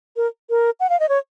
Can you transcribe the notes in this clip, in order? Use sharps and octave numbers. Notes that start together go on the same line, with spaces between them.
A#4
A#4
F#5
F5
D#5
C#5